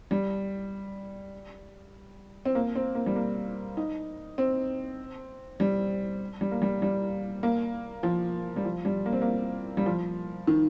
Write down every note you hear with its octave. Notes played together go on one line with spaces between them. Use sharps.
G3
C4
A#3
C4
A#3
G3
A#3
D#4
C4
G3
G3
A#3
G3
G3
A#3
F3
G3
F3
G3
A#3
C4
A#3
G3
F3
D#3